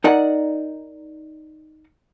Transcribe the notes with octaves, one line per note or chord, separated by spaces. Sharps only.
D#4 A#4 D5 D#5 F#5